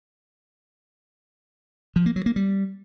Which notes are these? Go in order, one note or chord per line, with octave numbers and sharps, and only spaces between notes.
F3
A#3
F#3
A#3
G3